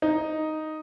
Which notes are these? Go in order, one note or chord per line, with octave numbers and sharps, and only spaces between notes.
D#4